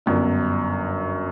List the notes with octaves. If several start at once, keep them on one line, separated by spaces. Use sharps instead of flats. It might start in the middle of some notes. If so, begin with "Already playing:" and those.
G1 F#2 D3